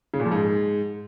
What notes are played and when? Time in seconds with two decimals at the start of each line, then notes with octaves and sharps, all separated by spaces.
0.14 C#3
0.20 A#2
0.26 F3
0.32 G#2